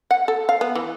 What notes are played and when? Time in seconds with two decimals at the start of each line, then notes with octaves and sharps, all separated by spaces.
0.11 F#5
0.28 A4
0.49 F5
0.61 B3
0.75 E3